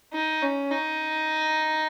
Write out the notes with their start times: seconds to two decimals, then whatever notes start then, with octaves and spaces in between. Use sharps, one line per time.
0.14 D#4
0.42 C#4
0.71 D#4